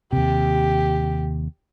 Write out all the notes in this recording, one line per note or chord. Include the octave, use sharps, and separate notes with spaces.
D#2 C3 G4